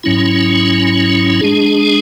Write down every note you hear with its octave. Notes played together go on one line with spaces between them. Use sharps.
G#2 F#3 C#4 E4
G#3 D4 G#4